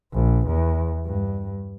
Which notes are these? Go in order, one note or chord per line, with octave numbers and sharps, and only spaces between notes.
A#1
E2
G2